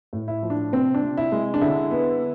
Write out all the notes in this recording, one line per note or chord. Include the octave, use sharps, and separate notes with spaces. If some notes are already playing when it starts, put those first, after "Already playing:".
A2
E4
F3
D4
C3 C4
D4
C3
E4
G#3
D4
D3 E4
B3